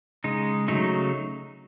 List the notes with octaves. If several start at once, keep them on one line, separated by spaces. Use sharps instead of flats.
C#3 G#3 D#4
C#3 F#3 A3 D#4